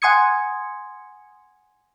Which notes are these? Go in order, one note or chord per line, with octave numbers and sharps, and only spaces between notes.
F#5 G#5 C6 D#6 G#6 C#7